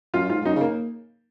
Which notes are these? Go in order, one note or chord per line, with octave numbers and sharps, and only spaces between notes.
F#2 F4
G#2 F4
G#2
F#2 D#4
C#3
A#3